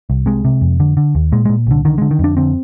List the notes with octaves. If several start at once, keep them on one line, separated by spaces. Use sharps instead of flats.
C2
C3 G#3
C3
F2
D3
D3
D#2
A#2 G#3
A#2 G#3
C2 D3
D3 D#3
D3 G#3
D#3
F2
D4
D3 C4